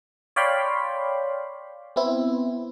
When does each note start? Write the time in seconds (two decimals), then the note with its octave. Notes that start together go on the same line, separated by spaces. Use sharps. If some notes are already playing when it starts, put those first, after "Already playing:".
0.36 C#5 D5 F5 G5 B5 C6
1.96 B3 C4 E4